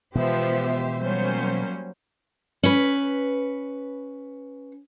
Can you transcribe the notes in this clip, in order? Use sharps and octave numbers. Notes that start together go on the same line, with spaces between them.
B2 E3 F3 G#3 B3 G4 C5 E5
F#3 G3 A#3 C#4 C5
C#4 B4